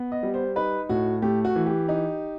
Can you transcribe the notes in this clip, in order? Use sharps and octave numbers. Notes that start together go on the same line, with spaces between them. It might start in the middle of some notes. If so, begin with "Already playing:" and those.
Already playing: B3
D#5
G3
C5
D#4 B4
A2 F#4
A3 G4
F#4
E3
G4
D#4